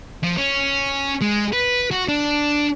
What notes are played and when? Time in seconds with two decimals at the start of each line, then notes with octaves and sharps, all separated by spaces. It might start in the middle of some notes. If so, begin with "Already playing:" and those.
0.23 F3
0.37 C#4
1.21 G#3
1.53 B4
1.91 F#4
2.08 D4